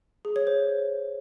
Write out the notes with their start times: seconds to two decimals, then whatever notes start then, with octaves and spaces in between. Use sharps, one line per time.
0.25 G#4
0.36 C#5
0.47 C5